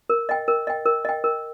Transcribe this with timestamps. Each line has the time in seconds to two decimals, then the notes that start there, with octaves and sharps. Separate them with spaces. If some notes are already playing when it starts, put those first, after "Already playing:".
0.09 A#4
0.29 D#5 G5
0.48 A#4
0.67 D#5 G5
0.86 A#4
1.05 D#5 G5
1.24 A#4